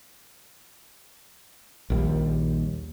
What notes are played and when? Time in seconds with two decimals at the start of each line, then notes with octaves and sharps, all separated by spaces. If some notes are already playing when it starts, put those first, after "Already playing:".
1.90 A#1 D#2 G3